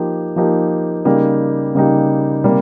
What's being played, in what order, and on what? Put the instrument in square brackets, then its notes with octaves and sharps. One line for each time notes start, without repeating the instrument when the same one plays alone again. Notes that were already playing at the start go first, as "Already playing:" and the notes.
Already playing: [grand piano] F3 A#3 D#4 G4
F3 A#3 D#4 G4
C#3 G3 A#3 D#4 G4
C#3 G3 A#3 D#4 G4
C3 G3 A#3